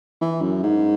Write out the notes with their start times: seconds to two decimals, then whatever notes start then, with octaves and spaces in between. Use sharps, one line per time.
0.21 E3
0.41 F#2
0.63 G#2